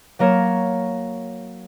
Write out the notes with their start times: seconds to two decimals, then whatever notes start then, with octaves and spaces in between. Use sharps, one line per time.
0.19 F#3 A#3 A#4 C#5 E7